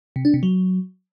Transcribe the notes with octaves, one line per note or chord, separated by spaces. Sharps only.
C3
D4
C3
F#3